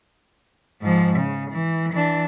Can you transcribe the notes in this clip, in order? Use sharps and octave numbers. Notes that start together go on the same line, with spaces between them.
G#2 F3
C#3
E3
E3 D4